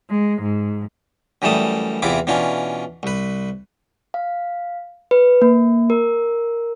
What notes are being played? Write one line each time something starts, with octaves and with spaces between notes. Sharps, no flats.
G#3
G#2
F#2 E3 G3 A3 A5 D#6
E2 C3 E3 E4 F4 D6
B2 E3 C#4 D4 F4
C2 B4
F5
B4
A#3
A#4